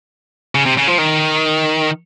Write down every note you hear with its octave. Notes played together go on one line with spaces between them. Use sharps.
C#3
C3
C#3
F3
D#3